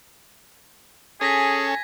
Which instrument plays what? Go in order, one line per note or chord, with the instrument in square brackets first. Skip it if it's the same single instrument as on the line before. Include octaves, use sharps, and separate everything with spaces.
[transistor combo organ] C#4 A4 [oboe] G#4 [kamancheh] G#5 [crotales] G#6 A#6 B6